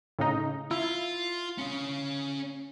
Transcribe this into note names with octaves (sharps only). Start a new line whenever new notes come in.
A2 C#3 D#4
E4 F4
C#4 F5